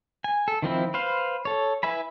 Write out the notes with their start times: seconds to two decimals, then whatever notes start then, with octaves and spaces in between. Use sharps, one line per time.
0.24 G#5
0.48 A4
0.62 D#3 F3 C4 E4
0.94 B4 C5 F5
1.45 A4 C#5
1.83 E4 B4 E5 G#5 B5